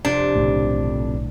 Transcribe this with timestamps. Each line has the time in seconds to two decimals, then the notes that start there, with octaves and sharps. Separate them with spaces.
0.05 F2 C3 D4
0.35 B1 A2 D3